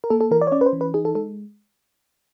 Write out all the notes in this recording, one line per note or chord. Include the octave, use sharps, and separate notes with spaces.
A#4
A#3 A4
A4
E3 A#4
D5
C#5
C#4 D5
B4
C5
E3
B4
D#4 G#4
A4
G#3 A4